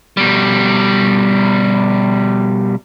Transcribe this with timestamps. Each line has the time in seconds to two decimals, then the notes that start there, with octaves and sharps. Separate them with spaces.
0.17 B2 G3